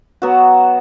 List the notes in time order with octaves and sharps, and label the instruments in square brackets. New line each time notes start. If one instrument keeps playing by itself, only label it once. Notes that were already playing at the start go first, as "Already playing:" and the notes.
[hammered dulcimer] F#3 B3 F#4